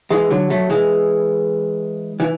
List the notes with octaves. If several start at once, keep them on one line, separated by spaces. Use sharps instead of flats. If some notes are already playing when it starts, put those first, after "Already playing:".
E3 G#3
D3 F#3
F#3 A3
E3 G#3
E3